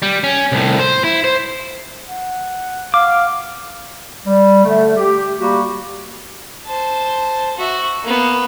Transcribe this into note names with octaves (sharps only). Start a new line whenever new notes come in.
G3
C#4
C2 A2
C5
E4
C5
F#5
F5 D6
G3
D3 A3
G4
G3 A#3 F#4 G4
C5 A5
F#4 E5
A#3 B3